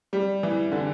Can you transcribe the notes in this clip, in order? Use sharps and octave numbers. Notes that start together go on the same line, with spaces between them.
G3
E3
D3